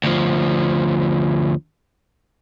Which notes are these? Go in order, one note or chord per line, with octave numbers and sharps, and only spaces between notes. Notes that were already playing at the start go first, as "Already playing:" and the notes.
D2 F3